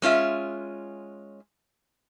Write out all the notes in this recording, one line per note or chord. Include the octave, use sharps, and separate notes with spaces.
G#3 C#4 F4 E5